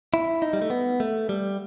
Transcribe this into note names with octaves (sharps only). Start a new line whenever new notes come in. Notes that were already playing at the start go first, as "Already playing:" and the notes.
E4
D#4
G3
A3
B3
A3
G3